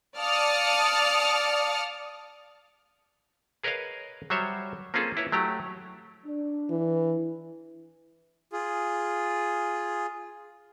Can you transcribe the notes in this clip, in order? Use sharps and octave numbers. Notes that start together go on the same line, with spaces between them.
D5 F5 A5 D#6 F6 C#7
G#4 A#4 B4 C#5 D#5 F5
F#3 G3 F#4 C5 C#5 E5
A#3 C4 C#4 F4 G#4 A4
E4 B4 C#5
F#3 A3 G4 A#5
D4
E3
F4 G#4